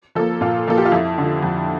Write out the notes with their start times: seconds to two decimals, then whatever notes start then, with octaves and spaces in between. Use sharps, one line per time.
0.15 F3 A#3 A4
0.41 A#2 F4
0.67 F3 A#3 A4
0.78 G4
0.85 F4
0.92 F2 E4
1.18 D3 F3
1.42 F2